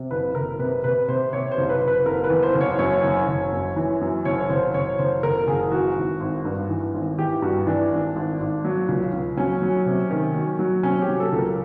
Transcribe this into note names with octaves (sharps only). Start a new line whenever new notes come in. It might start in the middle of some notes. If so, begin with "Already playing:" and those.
Already playing: C3
F#1 B4
F#1 A#4
C3 B4
C3 B4
C3 C5
C3 C#5
C5
F#1
B4
F#1
B4
F#1 A#4
B4
E2
C5
F#1
C#5
F#2 C#5
F#1
F#1
F#2
E3
F#2
F#1 C#5
F#1 C5
F#1 C#5
F#1 C5
F#1 A#4
F#1 G#4
E3 F#4
G#1
G#1
G2
E3
G#1
E3 G4
G2 F#4
E3 D4
G#1
G#1
G#1
F#3
C#2
C#2
F#3 C#4
F#3
C3
D#3
F#3
F#3
C3 C#4
G4
F#3
A4
C#2
A#4